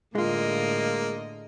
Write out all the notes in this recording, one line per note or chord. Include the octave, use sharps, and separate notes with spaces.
A2 D3 G#3 A#3 F4 D#5